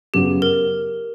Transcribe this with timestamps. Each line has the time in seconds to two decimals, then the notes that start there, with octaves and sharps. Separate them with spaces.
0.14 F#2 C#3 F#3 B3 G4
0.42 A#4